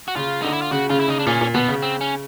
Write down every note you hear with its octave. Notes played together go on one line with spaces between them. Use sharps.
F#4
C#3 F4
D3 D#4
E4
F4
C#3 F#4
C#3 F4
E4
C#3 D#4
D4
A#2 C#4
A#2
B2 B3
C#3
C4
C#4